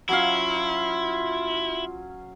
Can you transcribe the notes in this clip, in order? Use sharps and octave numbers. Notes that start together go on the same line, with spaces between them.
F#3 C#4 E4 F4 F5